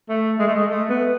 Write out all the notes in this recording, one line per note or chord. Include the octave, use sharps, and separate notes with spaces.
A3
G#3
A3
G#3
A3
B3